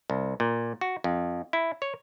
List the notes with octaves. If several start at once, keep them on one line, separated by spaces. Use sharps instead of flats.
C2
A#2
F#4
F2
E4
C#5